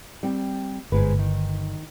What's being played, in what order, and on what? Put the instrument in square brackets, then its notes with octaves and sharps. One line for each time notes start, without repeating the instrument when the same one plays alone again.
[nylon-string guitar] G3 C4 G5
[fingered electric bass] G1 [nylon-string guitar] G#2 G#3 B4
[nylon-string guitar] D#3